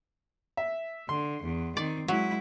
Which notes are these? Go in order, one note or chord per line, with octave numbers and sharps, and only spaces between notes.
E5
D3 C6
E2
D#3 C4 D5
F#3 G#3 E4